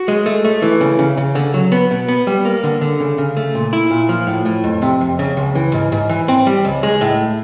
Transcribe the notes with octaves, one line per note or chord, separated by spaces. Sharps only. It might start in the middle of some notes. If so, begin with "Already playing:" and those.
Already playing: F#4
G#3
A3
A3
E3
C#3
C#3
C#3
D3
F#3
B3
B2
B3
G3
A#3
D3
D3
C#3
C#3
A3
A#2
E4
A#2
F3
A2
A2
F2
C3
F2
C#3
C#2
E3
G#2
G#2
E3
C4
G3
C#2
G#3
A2